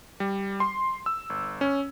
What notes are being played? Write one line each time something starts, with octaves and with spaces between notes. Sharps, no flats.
G3
C6
E6
G1
C#4